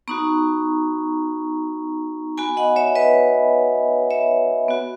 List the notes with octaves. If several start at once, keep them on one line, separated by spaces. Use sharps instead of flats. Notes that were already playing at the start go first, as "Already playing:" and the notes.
B3 D#4 F#4 A#5 C#6
B3 F#4 G#5 B5
D#5 F#5
C#5 E5
B4 D#5
C#5 E5
B3 F#4